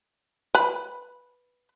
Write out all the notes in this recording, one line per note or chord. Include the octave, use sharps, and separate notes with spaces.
B4 B5